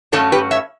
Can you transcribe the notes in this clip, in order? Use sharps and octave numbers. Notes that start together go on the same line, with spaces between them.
G2 F#3 A3 C#4 A4 C#5
G4 B4
C#5 E5